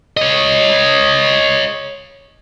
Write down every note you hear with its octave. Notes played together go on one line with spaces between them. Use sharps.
C#5 D#5